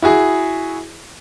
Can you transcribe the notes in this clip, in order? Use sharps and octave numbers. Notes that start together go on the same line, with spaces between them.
E4 F#4 G#4